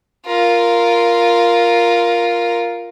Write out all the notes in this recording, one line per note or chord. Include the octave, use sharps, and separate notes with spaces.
F4 A#4